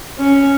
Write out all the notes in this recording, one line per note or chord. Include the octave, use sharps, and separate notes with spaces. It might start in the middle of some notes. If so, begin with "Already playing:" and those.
C#4